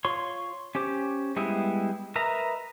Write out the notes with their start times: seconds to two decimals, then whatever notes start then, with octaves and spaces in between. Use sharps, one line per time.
0.05 F4 C#5 C6
0.75 C#4 G4 C5 D6
1.36 G3 G#3 B3 E4
2.16 A#4 B4 D#5 E5 A#5